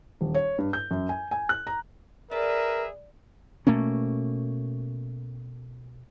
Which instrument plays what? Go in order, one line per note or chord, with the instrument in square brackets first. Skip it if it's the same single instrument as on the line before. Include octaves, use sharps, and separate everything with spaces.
[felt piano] D#1
C#5
G2
G6
F#2
G#5
G#5
F#6
A#5
[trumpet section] G#4 B4 E5 [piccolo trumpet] A#4 [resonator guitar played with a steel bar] D5
[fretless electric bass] B2 A3 A#3 C#4